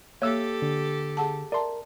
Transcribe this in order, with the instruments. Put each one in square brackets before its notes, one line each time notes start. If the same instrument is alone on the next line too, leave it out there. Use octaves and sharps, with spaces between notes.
[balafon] A#3 [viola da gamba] G4 A4 [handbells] C#5 E5 E6
[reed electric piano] D3
[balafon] G#4 F#5 A5
[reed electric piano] A#4 [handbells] D5 C6 [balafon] E5 A5